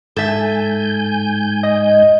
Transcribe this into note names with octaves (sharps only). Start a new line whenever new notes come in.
G#2 A4 E5 G#5 G6
D#5